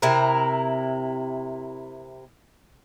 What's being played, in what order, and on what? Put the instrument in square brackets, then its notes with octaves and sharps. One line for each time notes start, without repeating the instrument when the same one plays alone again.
[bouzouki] C3 E4 A#4